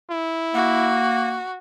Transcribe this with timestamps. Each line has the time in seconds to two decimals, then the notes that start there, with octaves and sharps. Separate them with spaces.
0.11 E4
0.55 A#3 F#4